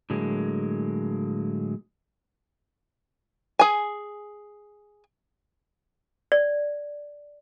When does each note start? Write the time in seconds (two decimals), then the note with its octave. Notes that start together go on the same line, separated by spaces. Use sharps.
0.10 A2 D3 F#3 G#3 A#3
3.59 G#4 G#5
6.32 D5